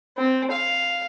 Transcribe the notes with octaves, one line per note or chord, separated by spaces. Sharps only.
C4
F5